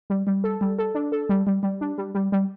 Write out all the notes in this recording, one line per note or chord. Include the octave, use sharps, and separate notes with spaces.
G3
G3
A4
G3
A4
D4
A4
G3
G3
G3
D4
G3
G3
G3